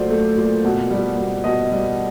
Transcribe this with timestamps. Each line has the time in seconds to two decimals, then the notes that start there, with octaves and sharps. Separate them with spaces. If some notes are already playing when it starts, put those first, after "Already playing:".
Already playing: A#2 F#3 A3 C5 D5
0.10 A3
0.37 A#2
0.65 B2
0.90 G3
1.17 B2
1.44 B2 D#5
1.71 G3